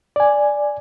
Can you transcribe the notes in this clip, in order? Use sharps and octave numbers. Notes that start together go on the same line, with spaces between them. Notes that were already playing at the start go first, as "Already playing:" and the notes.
D5 G#5